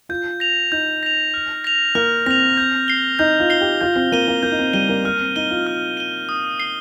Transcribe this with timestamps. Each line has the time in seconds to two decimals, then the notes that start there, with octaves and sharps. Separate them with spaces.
0.09 F4 G6
0.40 A#6 F7
0.72 D#4 G6
1.03 A#6 F7
1.34 F6
1.64 A#6 F7
1.95 A#3 F6
2.26 C4 A#6 F7
2.57 G6
2.88 C7 G7
3.19 D#4 G6
3.40 F4
3.50 C7 G7
3.61 G4
3.81 F4 G6
3.96 C4
4.12 A#3 D#7 G7
4.28 A#3
4.43 A#3 G6
4.52 D#4
4.59 C4
4.73 G3 D#7 G7
4.89 A#3
5.04 A#3 F6
5.20 C4
5.36 D#4 D#7 G7
5.51 F4
5.67 F6
5.97 D#7 G7
6.29 D#6
6.60 C7 G7